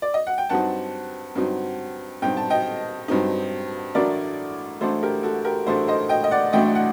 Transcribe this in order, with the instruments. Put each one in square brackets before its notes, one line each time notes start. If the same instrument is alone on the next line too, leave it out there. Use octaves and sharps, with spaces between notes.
[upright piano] D5
D#5
F#5
G5
G2 F#3 C4 D#4 F#5 A5
G2 F#3 C4 D#4
G2 F#3 C4 D#4 G5
A5
D#5 G5
G2 F#3 C4 D#4
A1 A2 F#3 A3 D4 A#4 D5
A1 A2 F#3 A3 D4 A4 C5
G4 A#4
F#4 A4
G4 A#4
A1 A2 F#3 A3 D4 A4 C5
C5 D#5
D#5 G5
D#5
D5 F#5
A1 A2 F#3 A3 D4 D#5 G5
F#5